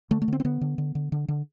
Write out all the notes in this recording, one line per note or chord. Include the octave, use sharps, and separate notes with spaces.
D3 A3
A3
D3 C4
C4
D3 B3
D3
D3
D3
D3
D3